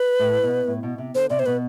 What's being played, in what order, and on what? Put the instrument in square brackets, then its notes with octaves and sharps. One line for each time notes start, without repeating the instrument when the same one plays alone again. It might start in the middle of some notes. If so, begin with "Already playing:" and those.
Already playing: [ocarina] B4
[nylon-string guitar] A2
B2
A2
B2
C3
[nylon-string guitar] D3 [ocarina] C5
[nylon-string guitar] C3 [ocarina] D5
[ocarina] C5
[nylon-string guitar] B2 [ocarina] B4